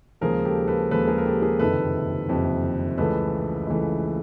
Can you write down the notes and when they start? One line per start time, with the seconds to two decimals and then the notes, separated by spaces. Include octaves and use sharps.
0.21 D#2 C#3 F3 G#3 G#4 A#4
0.45 G4 A4
0.68 A4 B4
0.91 D#2 C#3 F3 G#3 A4 B4
1.08 G#4 A#4
1.18 A#4
1.26 G4 A4
1.42 G#4 A#4
1.59 F#1 F2 C3 D#3 A4 B4
2.29 F#1 F2 C3 D#3
2.98 C#2 C#3 E3 A3 A4 B4
3.67 C#2 C#3 E3 A3